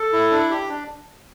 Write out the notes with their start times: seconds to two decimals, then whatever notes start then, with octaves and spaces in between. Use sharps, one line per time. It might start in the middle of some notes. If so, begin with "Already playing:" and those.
Already playing: A4
0.13 E4
0.31 D4
0.50 G4
0.69 D4